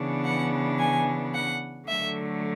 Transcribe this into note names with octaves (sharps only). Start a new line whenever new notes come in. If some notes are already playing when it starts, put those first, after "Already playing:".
Already playing: C#3 E3 B3 D4
F#5
G#5
F#5
D3 F#3 A3 E5